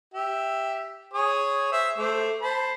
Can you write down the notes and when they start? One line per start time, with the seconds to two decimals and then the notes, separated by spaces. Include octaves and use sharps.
0.14 G4 E5
1.14 G#4 C#5 D#6
1.72 C5 E5
1.98 A3 C5 D6
2.42 C5 A5 B5